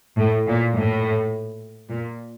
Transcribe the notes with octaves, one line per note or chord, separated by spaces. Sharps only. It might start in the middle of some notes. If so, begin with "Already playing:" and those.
A2
A#2
A2
A#2